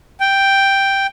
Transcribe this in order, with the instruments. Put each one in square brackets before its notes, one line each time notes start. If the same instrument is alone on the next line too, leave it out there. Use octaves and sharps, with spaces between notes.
[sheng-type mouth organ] G5